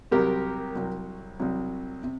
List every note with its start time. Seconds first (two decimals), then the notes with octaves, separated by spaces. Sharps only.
0.11 C2 C3 F#3 G4 A#4
0.75 C2 C3 F#3
1.40 C2 C3 F#3
2.04 C3